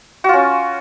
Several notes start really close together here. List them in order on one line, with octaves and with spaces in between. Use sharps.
F#4 F4 C#4